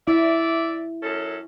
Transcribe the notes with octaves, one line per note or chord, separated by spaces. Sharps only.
E4 D5 E5
F#2 C#4 A4